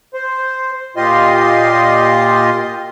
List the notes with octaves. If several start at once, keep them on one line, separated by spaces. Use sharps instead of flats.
C5
A#2 F4 G4 D#5 C6